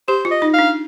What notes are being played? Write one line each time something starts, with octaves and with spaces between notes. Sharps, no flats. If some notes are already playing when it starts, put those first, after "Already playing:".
G4 C5
F4
D#5
D#4
D4 F5